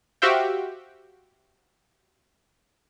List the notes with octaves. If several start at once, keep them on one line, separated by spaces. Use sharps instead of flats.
F#4 G4 C5 E5 F5 G5